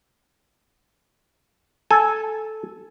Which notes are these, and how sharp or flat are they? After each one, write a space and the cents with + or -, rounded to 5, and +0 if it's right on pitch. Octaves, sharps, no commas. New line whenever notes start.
A4 -10 G#5 +5